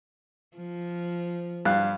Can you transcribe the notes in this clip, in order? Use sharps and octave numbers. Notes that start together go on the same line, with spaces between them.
F3
G2 F5 F#6